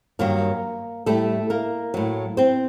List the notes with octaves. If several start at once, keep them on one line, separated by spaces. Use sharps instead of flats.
G2 D#3 F#3 A#3 A#4
A2 G3 A3 A4
A#3 A#4
A2 F#3
C4 C5